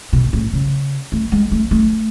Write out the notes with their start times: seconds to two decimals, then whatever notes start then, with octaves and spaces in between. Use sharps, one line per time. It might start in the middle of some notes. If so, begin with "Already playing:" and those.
0.13 B2
0.33 A2
0.53 C#3
1.12 A3
1.32 G#3
1.51 A3
1.71 A3